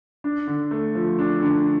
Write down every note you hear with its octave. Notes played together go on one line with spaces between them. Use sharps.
D4
D3
A3
F3
D4
D3